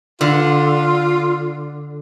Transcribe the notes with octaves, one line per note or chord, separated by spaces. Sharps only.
D3 F4